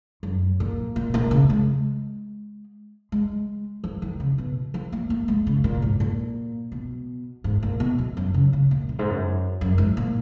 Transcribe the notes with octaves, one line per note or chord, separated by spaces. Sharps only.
F#2
A#2
A#2
A#2
C#3
G#3
G#3
F3
D#3
C#3
B2
F3
A#3
A#3
G#3
C#3
A#2
G#2
A#2
B2
G#2
A#2
B2
F2
F#2
C#3
C#3
A#2
F#2
G#2
F#2
F#2
G#2
A#2